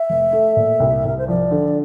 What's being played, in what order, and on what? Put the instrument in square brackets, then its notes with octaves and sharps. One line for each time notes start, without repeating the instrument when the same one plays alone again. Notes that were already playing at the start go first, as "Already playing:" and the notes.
Already playing: [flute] E5
[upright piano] F1
A3
A#2
C2
[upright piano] C2 [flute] A#4
[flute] C5
[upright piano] F3 [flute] D5
[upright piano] D3